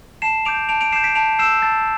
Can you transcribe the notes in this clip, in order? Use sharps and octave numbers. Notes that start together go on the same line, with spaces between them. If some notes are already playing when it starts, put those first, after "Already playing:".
A5 C7 E7
D6 G6 D7 F7
A5 D7 F7
D7 F7
D6 G6 C7 E7
B6 D7
A5 D7 F7
E6 G6 C7 E7
A5 A6